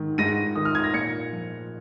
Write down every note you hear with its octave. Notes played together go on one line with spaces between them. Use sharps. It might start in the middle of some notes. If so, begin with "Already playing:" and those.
Already playing: G#2 D#3
G#2 A#6 D#7
D#3 D#6
F6
G#6
A#6
A#2 G#6 C#7
F3